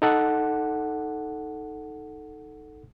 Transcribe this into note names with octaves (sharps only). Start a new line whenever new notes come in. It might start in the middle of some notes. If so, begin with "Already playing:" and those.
D#4 A4 F#5